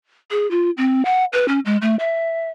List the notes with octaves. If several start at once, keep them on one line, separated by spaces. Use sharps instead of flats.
G#4
F4
C4
F#5
B4
C#4
G#3
A3
E5